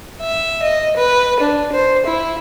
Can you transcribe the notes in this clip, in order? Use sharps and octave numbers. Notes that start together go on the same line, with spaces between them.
E5
D#5
B4
D4
C5
E4